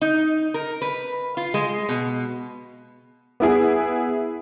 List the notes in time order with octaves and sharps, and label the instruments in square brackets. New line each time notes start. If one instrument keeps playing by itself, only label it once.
[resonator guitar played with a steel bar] D#4
A#4
B4
F4
G#3
B2
[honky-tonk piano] B3 E4 G#4